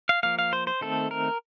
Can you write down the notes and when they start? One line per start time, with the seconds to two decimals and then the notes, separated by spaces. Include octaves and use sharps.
0.09 F5
0.23 F3 A#3 F5
0.39 F5
0.53 C5
0.67 C5
0.81 D#3 A3 C4 A4
1.11 A#4